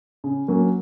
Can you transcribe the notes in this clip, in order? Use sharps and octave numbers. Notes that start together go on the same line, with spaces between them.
C#3
F#3 A#3 C#4